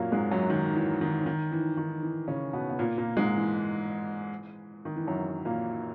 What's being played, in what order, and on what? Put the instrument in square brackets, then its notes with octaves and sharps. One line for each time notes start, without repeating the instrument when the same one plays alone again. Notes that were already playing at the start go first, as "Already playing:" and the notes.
Already playing: [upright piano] F#2 A#2 F#3 A#3
G#2 G#3
F#2 F#3
D#3
E3
D#3
D#3
E3
D#3
E3
C#3 C#4
B2 B3
B3
A#2 A#3
A#2 A#3
G#2 G#3
E3
D#3
E3
F#2 F#3
A#2 A#3